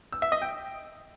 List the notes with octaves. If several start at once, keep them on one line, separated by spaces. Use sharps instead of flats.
E6
E5
D#5
G5